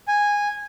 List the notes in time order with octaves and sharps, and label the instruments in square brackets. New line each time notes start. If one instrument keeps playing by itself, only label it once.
[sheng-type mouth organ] G#5